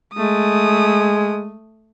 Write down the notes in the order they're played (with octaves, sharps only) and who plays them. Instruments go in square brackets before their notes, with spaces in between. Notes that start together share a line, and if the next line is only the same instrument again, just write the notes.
[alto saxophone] G#3 [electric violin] A3 D#6